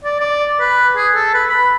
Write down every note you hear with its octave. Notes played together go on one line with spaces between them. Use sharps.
D5
D5
B4
G#4
A4
B4
B5